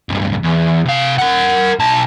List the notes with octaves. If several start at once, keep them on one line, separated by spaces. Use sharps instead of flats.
C#2 G2
E2
C3 F5
A#4 F#5
B1 A5